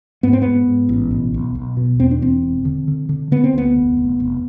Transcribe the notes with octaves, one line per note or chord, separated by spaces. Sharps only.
G#2 B3
C4
G#2 B3
G#2
A1
B1
B1
B1
B2
E2 C4
D4
E2 C4
E1
D3
D3
D3
D3 B3
C4
D2 B3
F1
F1
F1